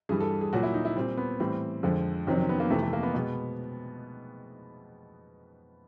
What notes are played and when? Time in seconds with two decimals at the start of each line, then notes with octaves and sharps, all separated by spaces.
0.09 G2 E3 G3 G#4
0.20 A4
0.41 G#4
0.53 A#2 F#3 F#4
0.63 E4
0.74 D#4
0.85 E4
0.96 A#2 G3 C4
1.17 B3
1.40 A2 E3 G3 C4
1.83 F2 D3 F3 G#3
2.27 F2 C3 D#3 F#3 C4
2.39 C#4
2.49 B3
2.60 A#3
2.70 F2 C3 E3 A3
2.82 A3
2.93 A#3
3.03 B3
3.14 B2 G#3